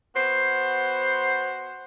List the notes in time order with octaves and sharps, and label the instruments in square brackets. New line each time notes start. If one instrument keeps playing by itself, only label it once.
[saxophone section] B3 F#4 C5